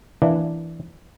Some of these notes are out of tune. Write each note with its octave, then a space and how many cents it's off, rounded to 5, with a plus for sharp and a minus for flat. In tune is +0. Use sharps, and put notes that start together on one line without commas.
E3 +0 A#3 +0 D4 +0